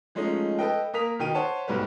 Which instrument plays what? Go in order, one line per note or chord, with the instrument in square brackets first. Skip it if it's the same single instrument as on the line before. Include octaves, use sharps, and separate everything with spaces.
[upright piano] F3 G#3 A3 C#4 D#4
A4 B4 D#5 G5
A#3 A#4 D#6 B6 F7
B2 D#3 G5 D#7
C5 C#5 F#5 A5
B1 G#2 G3 A3 B4